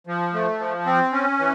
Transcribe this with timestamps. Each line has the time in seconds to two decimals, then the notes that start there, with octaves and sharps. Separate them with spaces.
0.07 F3
0.33 A3
0.60 F3
0.86 C4
1.12 C#4
1.39 E3